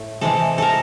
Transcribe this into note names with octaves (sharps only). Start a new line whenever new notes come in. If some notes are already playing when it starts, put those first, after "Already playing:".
Already playing: A2 A3
C3 E3 G#3 A4
A4 A#4